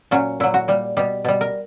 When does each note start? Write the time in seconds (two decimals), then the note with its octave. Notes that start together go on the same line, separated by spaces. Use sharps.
0.11 A#2 F#3 C#4
0.40 A#2 F#3 E4
0.54 F#4
0.68 A#2 G3
0.97 B2 G3 G4
1.24 B2 G3
1.41 A#4